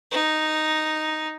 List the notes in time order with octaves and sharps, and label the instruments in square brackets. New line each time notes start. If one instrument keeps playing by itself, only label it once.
[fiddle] D#4